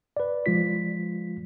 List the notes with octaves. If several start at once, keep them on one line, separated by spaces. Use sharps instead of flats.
B4 D5
F3 G#3 F4 B6